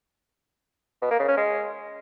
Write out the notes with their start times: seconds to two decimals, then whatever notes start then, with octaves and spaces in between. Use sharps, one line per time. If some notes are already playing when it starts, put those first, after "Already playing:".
1.02 B2
1.11 A#3
1.19 C#3
1.28 C#4
1.37 G#3